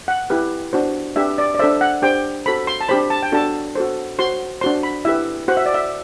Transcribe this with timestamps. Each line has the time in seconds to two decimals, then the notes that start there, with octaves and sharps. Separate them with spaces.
0.08 F#5
0.30 E4 G4 B4
0.73 D4 F#4 C5
1.16 D4 G4 B4 E5
1.38 D5
1.55 D5
1.59 D4 A4 C5 E5
1.81 F#5
2.02 D4 G4 C5 G5
2.46 F#4 A4 C5 B5
2.67 C6
2.81 A5
2.89 D4 G4 C5 B5
3.10 A5
3.23 G5
3.32 D4 F#4 A4 A5
3.75 F#4 A4 C5
4.19 F#4 C5 C6
4.61 D4 F#4 C5 C6
4.83 B5
5.05 E4 G4 B4 E5
5.48 F#4 C5 F#5
5.57 E5
5.66 D5
5.74 E5